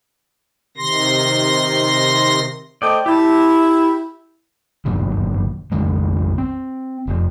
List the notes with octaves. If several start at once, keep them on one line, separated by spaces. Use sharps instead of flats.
C3 D#3 C6 A#6
A3 C5 D5 D#5 G5
E4 G4 A5
G1 F#2 A#2 D#3
A#1 F2 D#3 G#3
C4
F1 F2